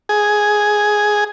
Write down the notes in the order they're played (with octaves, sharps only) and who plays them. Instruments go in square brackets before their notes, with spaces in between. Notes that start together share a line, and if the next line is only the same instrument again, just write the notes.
[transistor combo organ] G#4